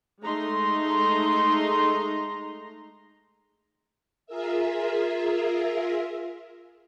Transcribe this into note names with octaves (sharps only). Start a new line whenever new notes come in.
G#3 A3 D#4 A#5 C6
F4 G#4 A#4 E5